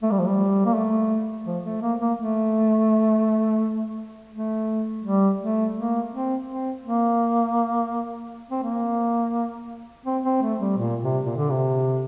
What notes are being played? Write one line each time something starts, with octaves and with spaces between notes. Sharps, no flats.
A3
G3
F3
G3
A#3
A3
F3
A3
A#3
A#3
A3
A3
G3
A3
A#3
C4
C4
A#3
C4
A#3
C4
C4
A3
G3
A#2
C3
A#2
D3
C3